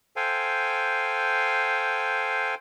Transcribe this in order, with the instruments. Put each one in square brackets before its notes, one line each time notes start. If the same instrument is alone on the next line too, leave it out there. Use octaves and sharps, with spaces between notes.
[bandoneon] A4 C5 F5 G5 G#5